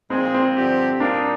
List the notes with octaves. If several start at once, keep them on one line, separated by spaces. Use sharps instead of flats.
A#2 F3 G#3 C4 D#4 G#4
C4
G2 D3 F3 C4 G4
A#2 G3 A#3 D4 D#4